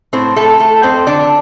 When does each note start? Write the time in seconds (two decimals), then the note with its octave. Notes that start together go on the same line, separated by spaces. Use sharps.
0.13 A2 C4 C5
0.36 A2 A3 A4
0.60 A2 A3 A4
0.83 F2 C4 C5
1.07 D3 D4 D5